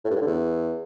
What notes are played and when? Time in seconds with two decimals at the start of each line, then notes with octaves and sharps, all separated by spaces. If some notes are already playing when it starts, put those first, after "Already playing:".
0.05 A2
0.10 G2
0.16 A2
0.21 D3
0.27 E2